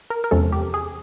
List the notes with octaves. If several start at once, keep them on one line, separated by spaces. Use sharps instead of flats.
A#4
A#4
E2 C3 F3 G#3 C#4 A4
G4
G#4